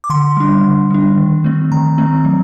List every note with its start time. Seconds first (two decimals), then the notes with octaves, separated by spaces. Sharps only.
0.04 D6
0.10 D3 C6
0.37 G3 D4
0.64 D3
0.90 G3 D4
1.17 D#3
1.44 A3 C4
1.72 D#3 A#5
1.98 A3 C4
2.25 F#3